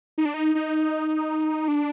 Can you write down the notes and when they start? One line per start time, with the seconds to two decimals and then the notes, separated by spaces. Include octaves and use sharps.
0.18 D#4
0.25 D4
0.34 D#4
0.55 D#4
1.68 D4